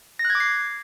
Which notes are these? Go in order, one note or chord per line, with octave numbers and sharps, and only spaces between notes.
A#6
F#6
G#6
D6
C7